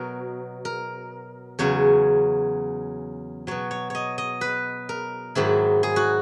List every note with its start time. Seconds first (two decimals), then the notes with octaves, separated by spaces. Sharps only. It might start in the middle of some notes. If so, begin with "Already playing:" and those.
Already playing: B2 F#3 A#4
0.65 A#4
1.59 E2 C#3 F#3 C#5
3.47 B2 F#3 C#5
3.71 C#5
3.90 C#5 D#5
4.18 D#5
4.41 B4
4.89 A#4
5.35 G#2 D#3 F#3 E4
5.83 G#4
5.96 F#4